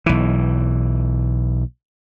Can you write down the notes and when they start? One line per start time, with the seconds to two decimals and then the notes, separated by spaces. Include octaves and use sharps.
0.06 B1 E3